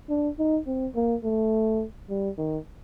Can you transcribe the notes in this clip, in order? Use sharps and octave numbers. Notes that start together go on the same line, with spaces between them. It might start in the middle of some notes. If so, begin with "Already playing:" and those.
D4
D#4
C4
A#3
A3
G3
D#3